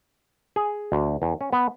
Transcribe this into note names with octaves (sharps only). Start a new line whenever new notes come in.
G#4
D2
E2
C#4
B3